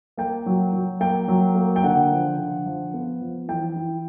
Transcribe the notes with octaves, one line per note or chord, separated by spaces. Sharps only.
A#3 G5
F#3
F#3
A#3 G5
F#3
A#3
G5
D3 F#5
F3
D3
F3
B3
F3
E3 G5
E4